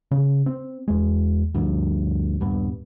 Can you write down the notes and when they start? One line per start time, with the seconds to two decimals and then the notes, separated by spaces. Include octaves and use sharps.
0.11 C#3
0.46 C4
0.88 E2 G#3
1.54 D2 G2 F3
2.40 D#1 G2 B3